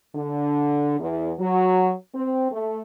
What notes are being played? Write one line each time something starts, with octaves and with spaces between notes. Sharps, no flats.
D3
E2
F#3
C4
A3